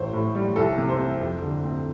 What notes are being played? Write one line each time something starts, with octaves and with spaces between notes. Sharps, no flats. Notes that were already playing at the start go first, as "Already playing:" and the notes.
Already playing: A1 C5
A2
G3
C2 A4
C3
C5
C4
F2
D3
C4